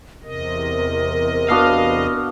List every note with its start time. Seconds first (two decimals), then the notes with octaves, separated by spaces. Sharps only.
0.23 E2 C3 A#4 D#5
1.50 B3 D4 F#4 F5